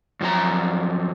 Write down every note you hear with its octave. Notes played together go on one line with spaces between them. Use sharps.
F#2 F3 G4 A#5